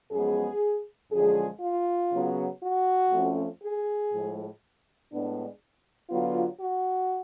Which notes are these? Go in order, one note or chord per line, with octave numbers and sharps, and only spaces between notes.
F#2 F3 G#3 B3 G#4
F#2 D3 F3 G#3 G#4
F4
C#3 F#3 B3
F#4
F2 F3 A3 C#4
G#4
A2 F3 G#3
A2 G#3 B3 D4
D3 F#3 B3 F4
F#4